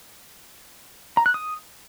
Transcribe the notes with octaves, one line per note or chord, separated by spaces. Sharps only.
A#5
F#6
D#6